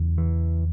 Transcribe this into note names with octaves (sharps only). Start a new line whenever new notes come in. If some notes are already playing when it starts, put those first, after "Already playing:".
Already playing: E2 C#3
E3